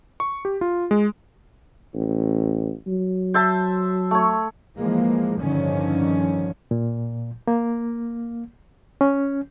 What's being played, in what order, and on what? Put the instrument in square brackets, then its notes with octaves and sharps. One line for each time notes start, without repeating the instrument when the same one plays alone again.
[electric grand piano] C#6
G4
F4
G#3
[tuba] A1
F#3
[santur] C5 E5 A5
A3 C#5
[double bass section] E3 F3 G#3 A#3
G2 D3 D#3 F3 C#4
[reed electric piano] A#2
A#3
C#4